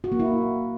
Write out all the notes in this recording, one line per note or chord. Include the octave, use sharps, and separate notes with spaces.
F#4
A#3
E4